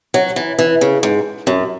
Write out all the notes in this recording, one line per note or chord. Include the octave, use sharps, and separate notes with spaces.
F#3
E3
E3
C#3
G#2
F#2